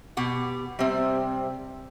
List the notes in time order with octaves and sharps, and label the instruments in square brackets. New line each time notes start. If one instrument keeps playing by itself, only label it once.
[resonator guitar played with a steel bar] B2 G4 F#5
[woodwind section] C3 [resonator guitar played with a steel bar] G3 C4